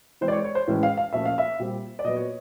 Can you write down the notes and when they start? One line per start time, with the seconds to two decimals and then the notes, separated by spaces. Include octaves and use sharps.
0.21 E3 G#3 C4 C5
0.28 D5
0.32 C#5
0.44 C#5
0.55 C5
0.68 A2 E3 G#3 C#4
0.83 F5
0.97 F5
1.13 A#2 F3 A3 C#4 E5
1.25 F5
1.38 E5
1.59 A#2 G3 C4
1.99 D5
2.04 A#2 F#3 B3 D#5
2.16 C#5